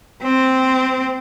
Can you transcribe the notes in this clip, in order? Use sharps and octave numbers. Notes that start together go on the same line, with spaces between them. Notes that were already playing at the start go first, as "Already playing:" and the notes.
C4